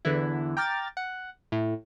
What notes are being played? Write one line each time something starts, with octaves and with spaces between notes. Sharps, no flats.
E2 D3 E3 E4
G5 A#5 D6 F6 A6
F#5
A2